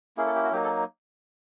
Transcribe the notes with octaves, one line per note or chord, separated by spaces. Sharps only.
A#3 C#4 E4 G#4
A4
G4
F#4
F#3 A#3 D#4 G4
A4